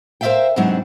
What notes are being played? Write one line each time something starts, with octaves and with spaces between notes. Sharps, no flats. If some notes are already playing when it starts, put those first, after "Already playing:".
A#4 C5 D5 E5 F5 G5
G#2 C3 E3 F#3 C4 D4